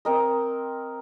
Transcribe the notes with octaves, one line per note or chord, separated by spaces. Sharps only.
C4 A#4 D#5